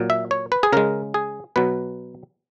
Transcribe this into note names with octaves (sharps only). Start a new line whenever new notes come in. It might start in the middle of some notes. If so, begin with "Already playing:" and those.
Already playing: A#2 F#3
E5
C#5
B4
G#4
C#3 G#3 A#4
G#4
B2 F#3 B4